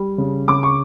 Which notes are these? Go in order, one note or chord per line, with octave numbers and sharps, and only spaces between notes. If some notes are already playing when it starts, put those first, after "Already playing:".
Already playing: G3
C#3
C#3 D6
C#6